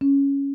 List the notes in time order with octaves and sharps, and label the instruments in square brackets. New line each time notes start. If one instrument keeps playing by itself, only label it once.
[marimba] C#4